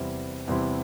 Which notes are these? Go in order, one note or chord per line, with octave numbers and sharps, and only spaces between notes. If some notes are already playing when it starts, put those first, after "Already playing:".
Already playing: E2 C3 G3 C4 E4
E2 C3 G3 C4 E4